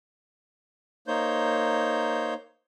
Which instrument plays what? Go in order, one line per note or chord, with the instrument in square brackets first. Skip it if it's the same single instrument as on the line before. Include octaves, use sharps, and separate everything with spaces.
[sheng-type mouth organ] A#3 D#4 C5 C#5 G6